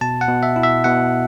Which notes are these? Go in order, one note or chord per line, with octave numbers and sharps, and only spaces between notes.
B2 A5
F#5
B2
E5
E4
E5
B2 F#5